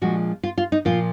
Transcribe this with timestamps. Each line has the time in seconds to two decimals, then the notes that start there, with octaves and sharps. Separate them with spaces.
0.02 A#2 F3 G#3 D4 F#4
0.43 F4
0.58 F4
0.72 D#4
0.85 A#2 F3 A#3 F4